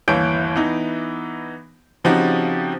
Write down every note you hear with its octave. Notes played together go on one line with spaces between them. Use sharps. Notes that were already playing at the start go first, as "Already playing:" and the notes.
G1 D#2 E3 C#5 G6 D7
E3 B3 D#4
C#3 F3 C4 D#4 F#4 G4